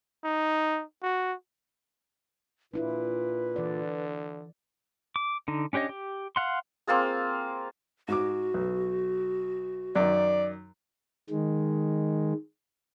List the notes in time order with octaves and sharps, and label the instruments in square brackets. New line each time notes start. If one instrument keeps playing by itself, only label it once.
[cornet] D#4
F#4
[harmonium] A#2 [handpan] D4 E4 F4 [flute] B4
[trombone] D3 [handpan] E3 D5
[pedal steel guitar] D6
D3 D#4
C#4 D4 G4 C#5 D#5
G4
F5 F#5 C6
[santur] A#3 C4 F4 G#4
[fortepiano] G#2 D6 [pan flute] F#4
[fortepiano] B1
[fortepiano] F#2 D#3 [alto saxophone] D5
[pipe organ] D#3 G#3